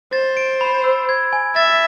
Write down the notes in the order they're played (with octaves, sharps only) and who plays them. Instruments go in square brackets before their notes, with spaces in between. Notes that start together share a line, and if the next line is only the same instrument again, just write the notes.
[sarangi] C5 [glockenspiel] A6
[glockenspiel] D7
B5
E6
G#6
G#5
[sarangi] E5 [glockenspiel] A6